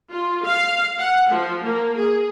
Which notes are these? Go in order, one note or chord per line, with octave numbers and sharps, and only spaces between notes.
F4
F5
F#5
F3
A#3
G#4